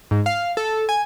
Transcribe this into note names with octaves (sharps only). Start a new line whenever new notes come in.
G#2
F5
A4
G#5